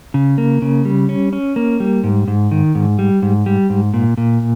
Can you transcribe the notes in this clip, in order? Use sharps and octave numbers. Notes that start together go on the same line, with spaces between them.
C#3
A#3
C#3
G3
C#4
C#4
A#3
G3
G#2
G#2
D#3
G#2
G3
G#2
G3
G#2
A#2
A#2